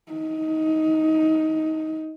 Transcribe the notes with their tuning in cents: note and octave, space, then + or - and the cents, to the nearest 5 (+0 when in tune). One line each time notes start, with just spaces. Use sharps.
D#4 +15